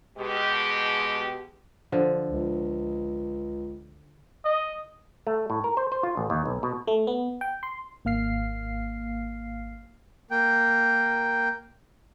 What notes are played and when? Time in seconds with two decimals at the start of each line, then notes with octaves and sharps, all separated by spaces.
0.17 B2 G#3 G4
1.92 D3 F3
2.29 C#2
4.45 D#5
5.27 A3
5.50 A2
5.64 A#4
5.77 C5
5.92 C5
6.03 F4
6.17 A1
6.30 D#2
6.46 B1
6.63 B2
6.87 A3
7.07 B3
7.41 G5
7.63 C6
8.05 G#1 A#3 F5 F6 C7
10.31 A#3 G5